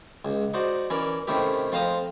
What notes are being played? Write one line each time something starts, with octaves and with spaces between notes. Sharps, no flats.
C#2
D#4 F#4 C5 D5
E3 C#4 A#4 D5
C3 D#3 A3 C#4 E4 G4
F2 F4 C5 F5 A#5 D#6